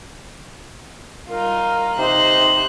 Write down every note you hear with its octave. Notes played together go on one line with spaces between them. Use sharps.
G3 D#4 F4 A#4
C3 D#4 C5 F#6